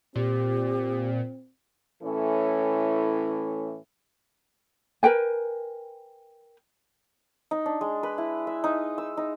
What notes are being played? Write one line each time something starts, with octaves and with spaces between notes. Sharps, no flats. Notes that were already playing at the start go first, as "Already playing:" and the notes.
A#2 C4 G4
A2 E3 C#4 E4 A4
A#4 B4 G5 G#5
D#4
D4
G#3
B4
E4
E5
D#4
E6
D#4